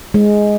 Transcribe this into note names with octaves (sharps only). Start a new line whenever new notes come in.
G#3